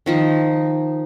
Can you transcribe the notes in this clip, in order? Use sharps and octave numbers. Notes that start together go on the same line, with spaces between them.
D#3 F3 D#4